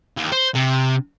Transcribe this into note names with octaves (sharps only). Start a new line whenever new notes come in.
D#2
C5
C3